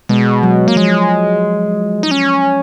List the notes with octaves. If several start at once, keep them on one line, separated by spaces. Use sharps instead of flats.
B2 G#3
F#3
A#3
F3 G#3
D#4
C#4